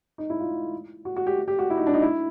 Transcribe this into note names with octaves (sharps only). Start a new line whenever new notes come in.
D#4
E4
F4
F#4
F#4
G4
G4
F#4
E4
D#4
D4
D#4
E4